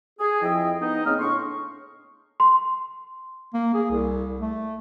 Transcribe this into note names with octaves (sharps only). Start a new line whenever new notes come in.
G#4
F2 F3 E4 D#5 E5 G5
B3 D#4
C#3 A#3 C4 D#5 F6
A2 D4 C6 C#6
C6
A#3
G#4
C2
A3